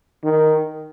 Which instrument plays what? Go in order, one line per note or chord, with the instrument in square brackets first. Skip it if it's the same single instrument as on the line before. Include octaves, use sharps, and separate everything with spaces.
[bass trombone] D#3